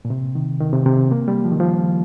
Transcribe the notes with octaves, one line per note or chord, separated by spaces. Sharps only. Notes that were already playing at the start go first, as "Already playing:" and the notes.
A#2
C3
D#3
D#3
C3
C3
A#3
G3
F3
D#3
F3